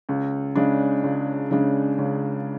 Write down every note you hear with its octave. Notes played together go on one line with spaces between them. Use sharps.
C#2
C#3 G#3 D4
C#2
C#3 G#3 D4
C#2